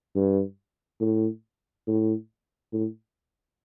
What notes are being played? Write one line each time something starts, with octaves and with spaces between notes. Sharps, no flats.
G2
A2
A2
A2